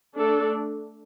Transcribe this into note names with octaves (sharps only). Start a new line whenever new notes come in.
A3 D4 A4